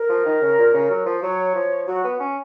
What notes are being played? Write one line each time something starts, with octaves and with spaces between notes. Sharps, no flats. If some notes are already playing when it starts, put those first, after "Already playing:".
Already playing: A#4
F3
D#3
C#3
A#2
C#3
F#3
F3
F#3 C#5
F3
F#3 F#4
B3
C#4